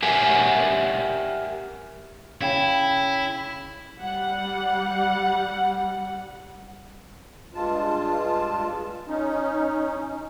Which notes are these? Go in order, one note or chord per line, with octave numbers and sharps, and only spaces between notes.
G4 A#4 E5 F#5 G#5
C#3 E4 G5
G3 F#5
G2 G#3 F4 A5
C#4 D#4